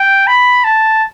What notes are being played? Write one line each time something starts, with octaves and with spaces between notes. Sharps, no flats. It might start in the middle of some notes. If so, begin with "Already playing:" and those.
Already playing: G5
B5
A5